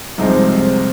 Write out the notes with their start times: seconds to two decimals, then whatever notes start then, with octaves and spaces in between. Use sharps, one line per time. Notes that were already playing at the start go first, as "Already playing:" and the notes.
0.18 C2 C3 F3 G#3 D#4
0.52 C4